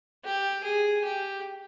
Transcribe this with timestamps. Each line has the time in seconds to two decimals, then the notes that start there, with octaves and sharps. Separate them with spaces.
0.24 G4
0.64 G#4
1.05 G4